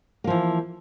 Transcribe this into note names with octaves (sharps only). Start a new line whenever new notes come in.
E3 F3 A#3